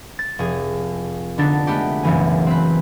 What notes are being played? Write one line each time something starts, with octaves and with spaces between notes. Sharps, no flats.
A6
F1 G#4
D3 B3 D4 D#4 A6
G#3 A3 B3 G4
F#1 B1 E3 G#5
C4 B4